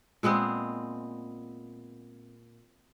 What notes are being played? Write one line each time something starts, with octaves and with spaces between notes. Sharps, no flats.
A#2 G#3 B3 C4